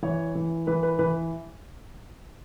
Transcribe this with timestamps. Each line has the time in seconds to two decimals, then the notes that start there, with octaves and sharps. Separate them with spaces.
0.02 E3 C#5
0.35 E3
0.67 E3 B4
0.83 B4
0.99 E3 B4